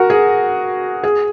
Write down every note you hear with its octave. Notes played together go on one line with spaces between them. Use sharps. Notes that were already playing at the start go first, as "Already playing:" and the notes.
Already playing: F#4 A#4
G#4
G#4